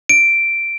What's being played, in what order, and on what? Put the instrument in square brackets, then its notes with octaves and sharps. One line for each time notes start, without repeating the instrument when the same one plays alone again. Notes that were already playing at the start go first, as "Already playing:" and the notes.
[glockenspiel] D7